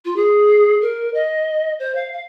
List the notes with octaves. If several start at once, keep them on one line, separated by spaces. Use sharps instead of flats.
F4
G#4
A#4
D#5
C5
F5
F5